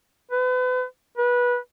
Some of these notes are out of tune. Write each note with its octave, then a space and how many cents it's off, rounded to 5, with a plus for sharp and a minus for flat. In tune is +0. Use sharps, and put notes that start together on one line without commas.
B4 +35
B4 -20